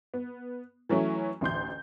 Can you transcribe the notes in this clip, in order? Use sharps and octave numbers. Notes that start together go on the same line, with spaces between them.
B3
E3 F#3 A3 C#4 E4
A1 D2 C6 G6